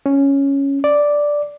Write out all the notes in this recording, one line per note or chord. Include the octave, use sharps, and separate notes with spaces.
C#4
D5